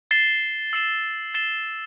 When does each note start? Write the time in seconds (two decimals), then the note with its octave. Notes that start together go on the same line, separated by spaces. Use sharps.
0.11 A6 C7 E7 G7
0.73 E6 C7 E7 G7
1.34 A6 C7 E7 G7